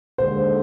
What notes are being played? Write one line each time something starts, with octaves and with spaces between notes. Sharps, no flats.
D#2 D3 G#3 C5